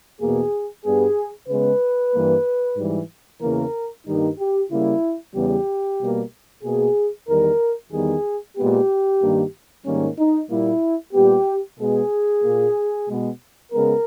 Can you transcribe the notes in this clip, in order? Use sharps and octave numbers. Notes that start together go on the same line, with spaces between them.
E2 B2 A#3 G#4
G2 G3 B3 G#4
C#3 G#3 B3 B4
G2 E3 G3 A#3
G#2 E3 G3
E2 C#3 E3 A#3 A#4
G2 D#3 G3 A#3 D#4
G4
C#3 G3 A#3 E4
E2 C#3 G3 B3 G4
B2 G3 A#3
B2 A#3 G#4
E2 D#3 G3 A#4
E2 D#3 G3 B3 G#4
A#2 G#3 B3 G4
G2 D#3 A#3
G#2 D#3 G3 A#3 C#4
D#4
A#2 G3 A#3 E4
A#2 G3 B3 G4
B2 G#3 B3 G#4
A#2 A#3
B2 G#3 B3
C#3 G#3 B3 A#4